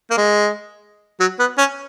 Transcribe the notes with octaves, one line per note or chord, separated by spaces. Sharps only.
A#3
G#3
F#3
B3
C#4